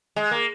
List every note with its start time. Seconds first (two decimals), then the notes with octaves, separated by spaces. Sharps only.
0.16 G#3
0.31 A#3